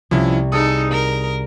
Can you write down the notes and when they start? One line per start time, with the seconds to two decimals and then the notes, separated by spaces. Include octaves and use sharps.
0.11 C2 F3 C#4 E4
0.52 D#4 G#4 A4 D#6 E6
0.91 A#4